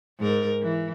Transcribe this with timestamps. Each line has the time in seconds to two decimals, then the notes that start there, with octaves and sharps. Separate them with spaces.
0.19 G#2 A#4
0.62 E3